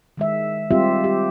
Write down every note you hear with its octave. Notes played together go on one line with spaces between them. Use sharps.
D#3 G#3 E5
G3 G#3 C4 F4 G4 E5
G4